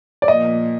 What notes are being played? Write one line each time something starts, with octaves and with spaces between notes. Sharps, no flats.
D5
A#2 F3 A#3 D#5